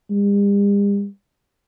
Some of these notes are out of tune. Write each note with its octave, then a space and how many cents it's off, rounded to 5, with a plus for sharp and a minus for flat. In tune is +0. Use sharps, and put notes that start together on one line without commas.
G3 +45